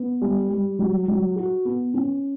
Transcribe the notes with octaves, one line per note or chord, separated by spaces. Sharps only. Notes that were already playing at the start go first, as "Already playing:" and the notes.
Already playing: B3
G3
G3
F#3
F#3
F#4
B3
C#4